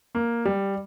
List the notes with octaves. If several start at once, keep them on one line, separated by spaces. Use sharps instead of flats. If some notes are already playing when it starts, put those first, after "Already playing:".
A#3
G3